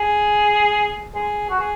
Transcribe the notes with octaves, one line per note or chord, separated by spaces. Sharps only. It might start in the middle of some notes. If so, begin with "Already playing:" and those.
Already playing: G#4
G#4
F#4
G#4